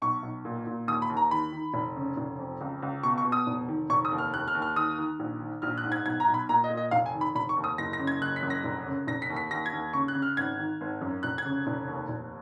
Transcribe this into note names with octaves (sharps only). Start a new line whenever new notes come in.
B1 C#6
B1
A#2
A#2
D#2 D#6
B5
D#2
A#5
D#3 B5
D#3
F1
C#3
F1
F2
C#2
C#2
B2 C#6
C#6
B2
D#6
F1
D#3
F1 C#6
D#6
D#2
F6
D#2 F#6
F6
D#2
F6
D#3 D#6
D#3
A#1
D#3
A#1 F6
F#6
G#2
G#6
B1 G#6
A#5
B1
B5
A#2 A#5
D#5
A#2
D#5
F1 F5
G#5
D#3
B5
F1 B5
C#6
D#2
D#6
F#1 A#6
A#6
C#3
G#6
F#1 F#6
B6
F#2
A#6
F1
C#3
F1 A#6
B6
D#2
B6
D#2 A#6
G#6
D#2
C#3 C#6
F#6
C#3
F6
G#1 G#6
D#3
G#1
F#2
F1 F#6
G#6
C#3
F1
D#2
F1